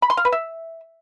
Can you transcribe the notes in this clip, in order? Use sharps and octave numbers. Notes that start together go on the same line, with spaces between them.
B5
C6
F5
B4
E5